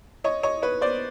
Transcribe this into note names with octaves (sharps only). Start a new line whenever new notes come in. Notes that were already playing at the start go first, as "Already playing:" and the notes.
C#5 D#5
C#5 D#5
B4 C#5
C5 D5